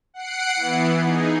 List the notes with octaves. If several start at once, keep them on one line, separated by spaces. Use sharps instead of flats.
F#5 C7 D7
E3 B3
D#4 G#4